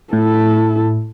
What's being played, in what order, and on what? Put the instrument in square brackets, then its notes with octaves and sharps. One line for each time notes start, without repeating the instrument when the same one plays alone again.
[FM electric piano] A2 [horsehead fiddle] E4 A4